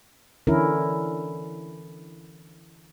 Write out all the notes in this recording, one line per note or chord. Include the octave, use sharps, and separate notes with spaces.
D3 E3 C#4 E4 A#4